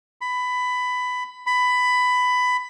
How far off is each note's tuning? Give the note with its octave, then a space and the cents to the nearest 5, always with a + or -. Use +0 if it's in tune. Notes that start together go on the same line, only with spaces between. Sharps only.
B5 +15
B5 +15